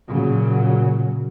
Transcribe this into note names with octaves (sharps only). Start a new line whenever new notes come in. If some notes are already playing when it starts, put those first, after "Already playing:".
A#2 C#3 F#3